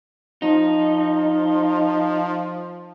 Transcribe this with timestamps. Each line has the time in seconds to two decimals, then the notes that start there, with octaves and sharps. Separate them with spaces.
0.42 F3 D#4